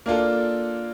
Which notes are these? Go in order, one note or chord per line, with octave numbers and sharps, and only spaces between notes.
A#3 D4 F4 A4